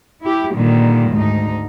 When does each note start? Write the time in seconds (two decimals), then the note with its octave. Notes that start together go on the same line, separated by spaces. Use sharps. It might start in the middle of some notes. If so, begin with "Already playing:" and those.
0.22 E4 G4
0.54 A#2 D3 D#3 G3
1.10 D2 G#2 D#4